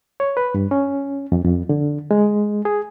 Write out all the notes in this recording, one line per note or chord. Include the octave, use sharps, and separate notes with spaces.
C#5
B4
G2
C#4
F2
F2
D3
G#3
G#4